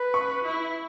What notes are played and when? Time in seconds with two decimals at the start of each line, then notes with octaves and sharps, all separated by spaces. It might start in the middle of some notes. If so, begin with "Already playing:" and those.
Already playing: B4
0.14 C#6
0.45 E4